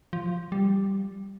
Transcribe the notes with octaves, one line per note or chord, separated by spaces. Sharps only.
F3
G3